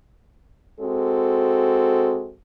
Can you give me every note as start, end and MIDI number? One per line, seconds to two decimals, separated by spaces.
0.80 2.33 56
0.80 2.33 60
0.80 2.33 66
0.80 2.33 69